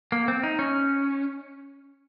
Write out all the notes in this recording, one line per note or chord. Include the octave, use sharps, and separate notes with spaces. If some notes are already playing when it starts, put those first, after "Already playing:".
A#3
C4
D#4
C#4